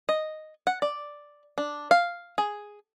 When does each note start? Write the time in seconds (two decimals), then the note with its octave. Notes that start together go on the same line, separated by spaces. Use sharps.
0.09 D#5
0.67 F#5
0.82 D5
1.58 D4
1.91 F5
2.38 G#4